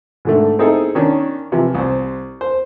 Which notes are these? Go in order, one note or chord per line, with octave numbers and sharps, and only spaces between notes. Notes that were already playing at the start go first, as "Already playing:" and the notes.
G#2 D3 A3
C4 D#4 E4 G#4 A4
D#3 C#4 D4
C3 E3 F3
C2 C5
C5